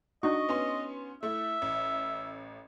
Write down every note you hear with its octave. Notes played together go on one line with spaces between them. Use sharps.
D4 D#4 F#4 D#5 C#6
B3 C#4 C6
A3 E4 E5
A1